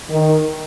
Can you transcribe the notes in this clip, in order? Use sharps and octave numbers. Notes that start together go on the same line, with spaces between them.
D#3